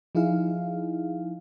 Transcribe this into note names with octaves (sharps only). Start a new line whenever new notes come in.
F3 D#4 E4 G#4 F5